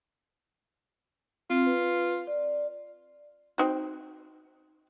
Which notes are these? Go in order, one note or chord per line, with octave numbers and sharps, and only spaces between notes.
C4 F4
B4
D5
C4 D#4 F#4